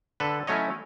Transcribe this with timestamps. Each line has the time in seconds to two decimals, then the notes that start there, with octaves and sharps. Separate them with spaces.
0.20 D3 A4 B4
0.47 F#3 A3 C#4 E4 C#5 D#5